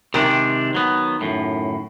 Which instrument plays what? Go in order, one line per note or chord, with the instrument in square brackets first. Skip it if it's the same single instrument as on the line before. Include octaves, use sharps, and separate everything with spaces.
[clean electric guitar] C3 G#3 D4 [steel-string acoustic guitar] D#3
[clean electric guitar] F#3 B3
F#2 A2